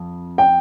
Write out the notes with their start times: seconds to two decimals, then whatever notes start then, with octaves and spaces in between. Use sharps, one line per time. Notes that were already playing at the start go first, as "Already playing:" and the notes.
Already playing: F2
0.38 G5